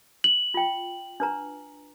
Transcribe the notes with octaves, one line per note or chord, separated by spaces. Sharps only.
F#7
F4 G5
D4 B4 A#5